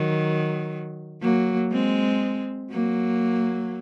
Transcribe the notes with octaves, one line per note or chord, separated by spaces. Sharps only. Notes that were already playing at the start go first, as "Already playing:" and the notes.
Already playing: D#3 F#3
F#3 A#3
G#3 C4
F#3 A#3